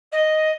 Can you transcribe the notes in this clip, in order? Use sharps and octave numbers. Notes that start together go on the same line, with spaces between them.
D#5